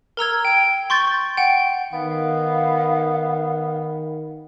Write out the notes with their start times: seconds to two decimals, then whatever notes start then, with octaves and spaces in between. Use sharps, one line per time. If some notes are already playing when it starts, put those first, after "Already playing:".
0.17 A#4 A#5 E6 G#6
0.45 G5 D7
0.90 C6 C#6 G6 A6
1.37 F#5 G5
1.93 D#3 B3 F5